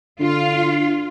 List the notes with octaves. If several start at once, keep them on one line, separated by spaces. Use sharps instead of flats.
D3 F4